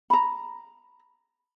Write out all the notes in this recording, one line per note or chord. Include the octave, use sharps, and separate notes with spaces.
A#5 B5